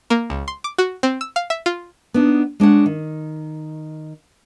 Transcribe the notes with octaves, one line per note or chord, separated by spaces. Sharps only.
A#3
C#2
C6
D6
F#4
C4
E6
F5
E5
F4
B3 D4 D#4
G#3 D4 C#5 F#5
D#3